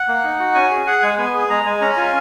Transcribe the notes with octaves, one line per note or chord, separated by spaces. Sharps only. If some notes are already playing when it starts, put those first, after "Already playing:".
Already playing: F#5
A#3
D#4
F#4
C#4 G#5
G#4
G#4 F#5
G#3 G#5
B3 G#5
G#4 G#5
G#3 A#5
G#3 G#5
C#4 A#5
A#5
F4 G#5